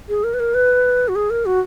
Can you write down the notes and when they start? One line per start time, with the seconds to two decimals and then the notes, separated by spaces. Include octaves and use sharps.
0.09 G#4
0.24 A#4
0.34 B4
0.40 A#4
0.54 B4
1.08 F#4
1.15 G#4
1.30 A#4
1.46 F#4